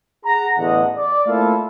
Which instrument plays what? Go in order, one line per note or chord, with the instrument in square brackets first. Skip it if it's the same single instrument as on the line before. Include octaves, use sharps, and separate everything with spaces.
[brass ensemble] G#4 F#5 A#5
A1 E2 D3 D#5 F#5
D5
A3 A#3 C4 E4 F4 A4